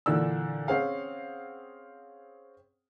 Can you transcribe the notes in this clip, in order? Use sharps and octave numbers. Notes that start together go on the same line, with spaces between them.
A#2 D3 E3 D4 E6
C4 C#4 G#4 F5 F#5